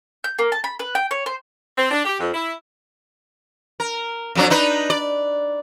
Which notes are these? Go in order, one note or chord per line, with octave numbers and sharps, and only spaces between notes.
G6
A#3
A5
B5
B4
G5
C#5
C5
C4
D4
G4
F2
E4
A#4
F2 F#3 D4
D4 D#4 B4
D5